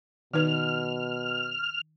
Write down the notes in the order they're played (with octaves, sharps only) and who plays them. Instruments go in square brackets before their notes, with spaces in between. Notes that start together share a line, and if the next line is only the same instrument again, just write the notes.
[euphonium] B2 [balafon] D#3 D#4 B4 [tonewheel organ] F6